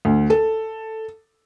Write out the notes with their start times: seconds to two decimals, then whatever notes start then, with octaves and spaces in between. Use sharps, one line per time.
0.05 D2
0.30 A4